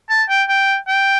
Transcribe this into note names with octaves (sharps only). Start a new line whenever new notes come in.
A5
G5
G5
G5